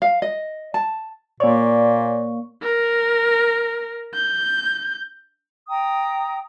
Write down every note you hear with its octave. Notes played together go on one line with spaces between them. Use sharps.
F5
D#5
A5
A#2 A#3 C#5 D5 C#6
A#4
G6
G5 A#5 D#6